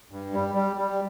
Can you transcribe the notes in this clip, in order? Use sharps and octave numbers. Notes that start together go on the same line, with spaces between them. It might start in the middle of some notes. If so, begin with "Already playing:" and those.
G2
G3
G3
G3